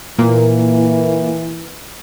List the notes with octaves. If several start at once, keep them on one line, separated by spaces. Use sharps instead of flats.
A#2 E3 A#3